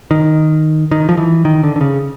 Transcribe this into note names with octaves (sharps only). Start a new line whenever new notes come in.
D#3
D#3
F3
E3
D#3
D3
D3
C#3